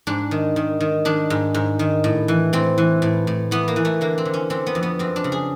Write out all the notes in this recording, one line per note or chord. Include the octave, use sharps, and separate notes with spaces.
G#2 D4
D#3
D#3
D#3
D#3 D4
G#2
G#2
D#3
A2
E3
A2 C4
E3
A2
A2
E3 B3
A#3
E3
A3
D3 A#3
C4
D3
C#4
D3 C4
B3
F2
B3
F#2 C4
D4
C#3
G#4